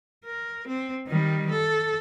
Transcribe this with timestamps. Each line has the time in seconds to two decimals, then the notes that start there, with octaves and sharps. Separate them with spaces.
0.25 A#4
0.67 C4
1.08 D#3 G3
1.51 A4